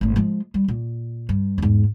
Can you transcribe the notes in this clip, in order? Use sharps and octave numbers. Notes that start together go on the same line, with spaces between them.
G#1 A2
F3 G#3
G3
A#2
G2
E2 G#2